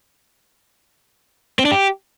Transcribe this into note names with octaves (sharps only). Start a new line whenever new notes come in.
C4
D4
G4